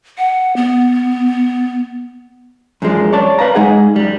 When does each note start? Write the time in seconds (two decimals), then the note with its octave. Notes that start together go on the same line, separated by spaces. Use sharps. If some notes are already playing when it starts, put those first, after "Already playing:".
0.18 F#5
0.56 B3
2.82 F#2 F3 G#3 D4
3.13 C#5 D5 A5
3.39 B4 F5 A#5
3.55 G#3 D#4 G#4 F#5
3.96 F#2 G3